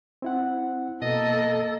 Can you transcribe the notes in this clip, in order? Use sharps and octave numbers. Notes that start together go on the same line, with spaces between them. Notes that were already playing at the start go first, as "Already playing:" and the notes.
C4 E4 F#5
B2 A#3 A4 D#5